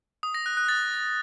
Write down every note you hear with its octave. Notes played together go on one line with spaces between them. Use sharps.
D#6
A#6
F#6
F#6
A6